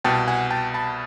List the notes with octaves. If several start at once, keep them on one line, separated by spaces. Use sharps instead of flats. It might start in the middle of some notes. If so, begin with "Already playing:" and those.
C2 B2 G5 A5
F#5 G#5
G5 A5
A5 B5